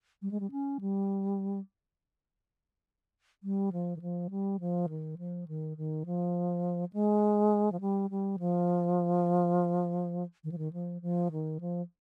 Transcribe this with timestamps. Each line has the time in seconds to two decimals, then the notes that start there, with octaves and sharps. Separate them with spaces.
0.22 G3
0.31 G#3
0.40 G3
0.51 C#4
0.81 G3
3.43 G3
3.72 F3
3.96 D#3
4.01 F3
4.30 G3
4.60 F3
4.89 D#3
5.18 F3
5.48 D#3
5.77 D#3
6.06 F3
6.93 G#3
7.72 F3
7.81 G3
8.10 G3
8.39 F3
10.44 D#3
10.52 F3
10.58 D#3
10.73 F3
11.02 F3
11.32 D#3
11.60 F3